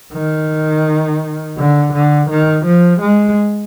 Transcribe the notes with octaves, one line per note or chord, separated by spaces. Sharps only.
D#3
D3
D3
D#3
F3
G#3